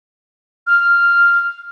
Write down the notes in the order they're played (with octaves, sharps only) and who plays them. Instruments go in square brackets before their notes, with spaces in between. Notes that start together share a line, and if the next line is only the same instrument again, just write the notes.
[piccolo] F6